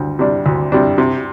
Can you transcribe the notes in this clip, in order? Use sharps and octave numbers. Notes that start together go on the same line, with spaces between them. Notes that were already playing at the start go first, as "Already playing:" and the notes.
Already playing: D2 G3
C3 G3 D4
D2
C3 G3 D4
C3